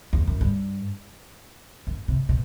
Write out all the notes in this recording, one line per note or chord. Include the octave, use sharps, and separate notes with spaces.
E2
F#2
G2
F#2
C3
B2